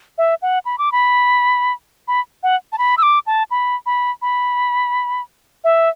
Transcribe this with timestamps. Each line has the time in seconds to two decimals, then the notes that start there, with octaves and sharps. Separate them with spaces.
0.18 E5
0.42 F#5
0.65 B5
0.78 D6
0.92 B5
2.08 B5
2.43 F#5
2.72 A5
2.78 B5
2.98 E6
3.03 D6
3.27 A5
3.51 B5
3.86 B5
4.22 B5
5.64 E5